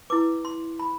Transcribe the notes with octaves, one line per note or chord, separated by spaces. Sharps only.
E4 B4 D6
C6
B5